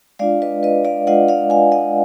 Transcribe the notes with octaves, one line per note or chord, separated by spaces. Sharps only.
G#3 D4 F4 D5 F5
B4 D#5
B4 D#5
D5 F5
G#3 D4 F4 D#5 F#5
D5 F5
F5 G#5
D#5 F#5